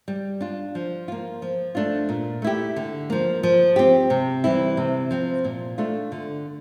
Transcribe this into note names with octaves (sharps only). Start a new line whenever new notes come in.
G3
D4 F4
F3
A#3 F4
F3
A3 D4 F4
A#2
A3 E4 G4
D3
F3 A#3
F3
C4 G4
C3
E3 G3 C4 E4
C3
F3 C4
A#2
A3 D4 F4
D3